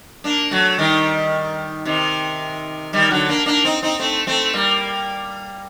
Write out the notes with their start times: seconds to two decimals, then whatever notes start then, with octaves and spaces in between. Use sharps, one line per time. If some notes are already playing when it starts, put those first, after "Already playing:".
0.24 A#3 D4
0.51 F#3 A3
0.78 D#3 G3
1.85 C3 D#3
2.93 D#3 G3
3.10 D3 F#3
3.29 A#3 D4
3.46 A#3 D4
3.65 C4 D#4
3.82 C4 D#4
3.99 A3 C4
4.27 A3 C4
4.53 G3 A#3